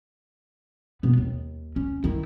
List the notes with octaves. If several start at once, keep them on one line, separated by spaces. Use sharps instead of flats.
B2 B3
D#2
C#4
D#3 E4